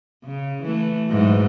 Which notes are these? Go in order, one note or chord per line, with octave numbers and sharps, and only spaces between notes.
C#3
E3 A3
G#2 E3 F#3